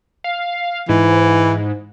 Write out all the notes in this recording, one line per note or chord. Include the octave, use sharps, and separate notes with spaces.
F5
G#2 E3